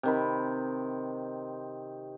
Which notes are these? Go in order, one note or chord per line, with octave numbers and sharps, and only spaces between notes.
C3 D#3 B5